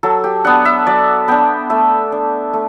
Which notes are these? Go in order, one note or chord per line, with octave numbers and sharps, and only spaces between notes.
F#3 A4
G4
B3 D4 F#5
E5
F#3 D5
B3 D4 G5
A3 E5
D4
A3